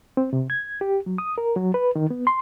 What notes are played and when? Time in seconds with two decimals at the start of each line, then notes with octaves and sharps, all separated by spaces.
0.17 C4
0.33 C3
0.50 G#6
0.81 G4
1.06 F#3
1.18 D#6
1.38 A#4
1.56 F#3
1.74 B4
1.96 D#3
2.10 B3
2.27 C6